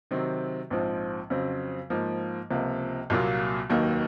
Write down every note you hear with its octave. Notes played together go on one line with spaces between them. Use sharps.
C3 D#3 F#3 C4
A#1 G#2 F3 C4
F2 C#3 F#3 C4
G#2 F3 A#3
C#2 C3 F3 A#3
C2 A#2 F#3 A#3 F4
F1 D#2 D#3 F#3 A#3